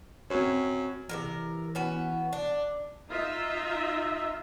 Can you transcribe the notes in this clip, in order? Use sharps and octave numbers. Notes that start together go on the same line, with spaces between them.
F#2 C4 C#5
C3 D#3 E3 A#4
B3 C#4 F#4
D4
D#4 F4 D#5 E5